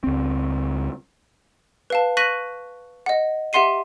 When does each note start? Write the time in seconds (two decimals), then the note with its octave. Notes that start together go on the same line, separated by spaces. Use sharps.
0.04 C#2 C4
1.90 B4 F5 A5
2.17 C#6 F#6 A#6 B6 D#7 F#7
3.06 D#5 F#5
3.53 G4 E5 F#5 C6 C7 D#7